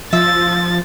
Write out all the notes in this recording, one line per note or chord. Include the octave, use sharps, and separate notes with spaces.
F3 E5 A6